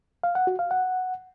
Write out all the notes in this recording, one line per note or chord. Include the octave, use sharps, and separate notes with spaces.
F5
F#5
F#4
F5
F#5